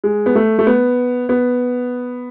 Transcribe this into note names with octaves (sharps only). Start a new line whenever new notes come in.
G#3
B3
A3
A3
B3
B3